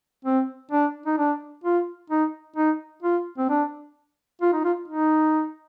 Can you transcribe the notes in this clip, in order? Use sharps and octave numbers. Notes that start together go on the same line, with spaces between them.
C4
D4
D#4
D4
F4
D#4
D#4
F4
C4
D4
F4
D#4
F4
D#4